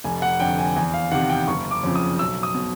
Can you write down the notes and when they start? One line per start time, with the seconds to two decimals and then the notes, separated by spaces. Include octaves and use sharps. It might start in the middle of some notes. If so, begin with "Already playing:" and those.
0.04 F1 G#5
0.22 F#5
0.40 F2 D3 G5
0.58 G#5
0.76 E2 G#5
0.94 F5
1.12 D#3 F#5
1.14 C3
1.29 G5
1.48 F#1 C#6
1.71 D6
1.83 F2 C#3 F3
1.95 D#6
2.19 B1 E6
2.43 D#6
2.54 B2